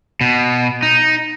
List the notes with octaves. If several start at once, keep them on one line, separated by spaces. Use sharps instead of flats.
B2
D#4